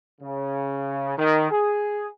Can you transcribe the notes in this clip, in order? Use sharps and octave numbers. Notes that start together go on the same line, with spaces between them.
C#3
D#3
G#4